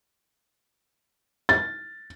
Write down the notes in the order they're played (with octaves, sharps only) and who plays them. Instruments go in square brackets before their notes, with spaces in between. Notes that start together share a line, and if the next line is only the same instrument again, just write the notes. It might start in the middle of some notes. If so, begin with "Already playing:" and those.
[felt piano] A6